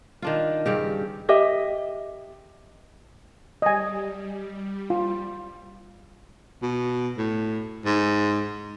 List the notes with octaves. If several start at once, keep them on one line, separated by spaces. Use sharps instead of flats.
D#3 D4 F4
G2 C#3 G4
G4 D#5 E5
G3 D#5 G#5
F4
B2
A2
G#2